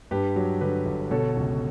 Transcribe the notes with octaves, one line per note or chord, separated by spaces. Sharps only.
G2 G4 B4
F#3
D3 G4 B4
G1
B2 A4 C#5
C#2